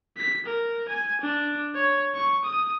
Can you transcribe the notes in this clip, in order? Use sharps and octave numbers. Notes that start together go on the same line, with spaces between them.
B6
A#4
G#5
D4
C#5
C#6
D#6